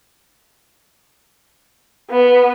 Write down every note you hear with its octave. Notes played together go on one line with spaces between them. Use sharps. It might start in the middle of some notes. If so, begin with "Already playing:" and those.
B3